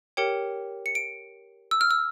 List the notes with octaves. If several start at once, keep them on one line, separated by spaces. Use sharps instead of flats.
G4 A#4 C#5 G5 C#7
C#7
D7
E6
F6
E6